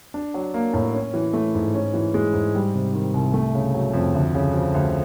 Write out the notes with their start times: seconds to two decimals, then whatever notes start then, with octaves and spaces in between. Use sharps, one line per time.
0.14 D4
0.34 F#3
0.54 A#3
0.74 A2
0.95 C#4
1.14 E3
1.34 A3
1.55 G#2
1.75 C#4
1.94 E3
2.14 G#3
2.34 G#2
2.55 G3
2.74 C3
2.94 D#3
3.14 C2
3.34 A3
3.55 C#3
3.74 F#3
3.94 F2
4.14 D2
4.35 C#3
4.54 F3
4.75 D2